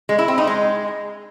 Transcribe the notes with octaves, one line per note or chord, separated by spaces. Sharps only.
G#3
E4
C4
D#4
G#3